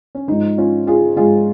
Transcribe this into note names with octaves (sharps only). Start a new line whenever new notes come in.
C#4
G#2 F3 D#4
C#4 F4
F4 G#4
G#2 F3 F4 G#4